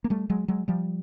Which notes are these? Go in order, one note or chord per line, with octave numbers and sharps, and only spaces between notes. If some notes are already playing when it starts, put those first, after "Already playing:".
A#3
G3 A3
F#3 G#3
F#3 G#3
F3 G3